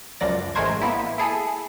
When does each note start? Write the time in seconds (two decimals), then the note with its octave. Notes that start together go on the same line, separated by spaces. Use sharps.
0.20 C#2 F#2 F3 D5 A#6
0.55 A1 G#3 A3 A#4 C5 G#6
0.81 A#3 B3 E4
1.18 E4 G#4 A4